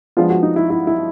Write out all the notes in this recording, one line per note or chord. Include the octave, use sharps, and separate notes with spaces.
F3 G#3 B3 D4 F4
F#4
D#4
E4
E4
E4